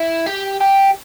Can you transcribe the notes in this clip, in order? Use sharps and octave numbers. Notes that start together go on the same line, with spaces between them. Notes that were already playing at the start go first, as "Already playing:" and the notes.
Already playing: E4
G4
G4